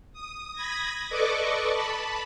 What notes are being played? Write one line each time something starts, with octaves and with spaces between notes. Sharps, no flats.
D#6
B5 D#6 G#6 A#6
A4 B4 D5 D#5 C#6 D6
A5 B5